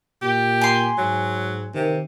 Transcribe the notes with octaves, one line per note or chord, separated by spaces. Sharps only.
A#2 G4
G#5 C6
G#2 F#3
C3 D#3